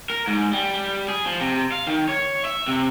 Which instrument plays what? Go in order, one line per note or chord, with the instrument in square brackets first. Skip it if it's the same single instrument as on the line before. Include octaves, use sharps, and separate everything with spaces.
[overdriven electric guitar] A#4
G#2
G3
G#4
F3
C3
F5
D#3
C#5
E5
C3